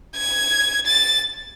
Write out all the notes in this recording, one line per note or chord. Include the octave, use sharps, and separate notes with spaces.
G#6
A6